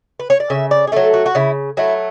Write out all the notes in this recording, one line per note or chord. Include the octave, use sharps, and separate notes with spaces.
B4
C#5
D5
C#3 E5
D5
G#4
F#3 A3 A4
F#4
F#4
C#3 E4
F#3 A3 E4